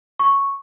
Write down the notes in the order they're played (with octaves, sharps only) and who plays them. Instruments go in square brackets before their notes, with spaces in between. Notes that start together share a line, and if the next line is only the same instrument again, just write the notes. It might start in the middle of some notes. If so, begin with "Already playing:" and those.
[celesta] C#6